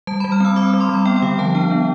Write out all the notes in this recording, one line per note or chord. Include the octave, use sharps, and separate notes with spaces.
G3 A5
B5
G3
F6
C4 E6
C4 D6
G3
C6
G3 B5
B3 G5
G5
D3 F5
F3 A5
D4 G5
B3